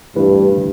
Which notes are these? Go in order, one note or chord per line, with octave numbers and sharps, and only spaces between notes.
G2 E3 A3 E4 G4 B4
D3